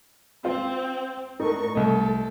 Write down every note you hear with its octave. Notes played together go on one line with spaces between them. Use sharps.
C4 F4
A2 D4 D#4 A4 A#4 C#6
C2 A3 A4 D#5